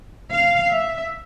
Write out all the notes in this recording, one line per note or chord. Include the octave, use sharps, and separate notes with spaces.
F5
E5